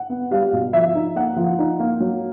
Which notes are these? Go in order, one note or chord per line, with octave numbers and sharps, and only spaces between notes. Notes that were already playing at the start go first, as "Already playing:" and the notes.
Already playing: F#5
B3
G3 F5
B2
F3 E5
D#4
A#3 F#5
F3
D#4
A#3
F#3